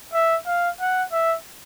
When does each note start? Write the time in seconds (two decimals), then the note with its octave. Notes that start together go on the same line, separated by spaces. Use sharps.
0.14 E5
0.46 F5
0.80 F#5
1.12 E5